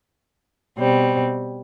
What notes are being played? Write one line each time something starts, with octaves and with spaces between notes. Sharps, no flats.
B2 G3 C4